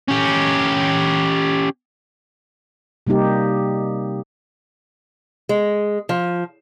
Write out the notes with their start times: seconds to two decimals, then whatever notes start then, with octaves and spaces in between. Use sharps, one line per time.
0.08 C#4 G4
3.07 C3 G3 A#3 D#4 G4
5.49 G#3
6.09 F3